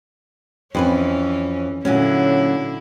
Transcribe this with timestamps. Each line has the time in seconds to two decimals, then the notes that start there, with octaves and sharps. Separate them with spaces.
0.75 F2 E3 C#4 B4 G#5
1.85 A#2 D3 F#3 C#4 E4